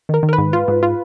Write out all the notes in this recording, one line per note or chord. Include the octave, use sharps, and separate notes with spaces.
D#3 A#4
D#3
A#4
B4
G#2
F4
G#2
F4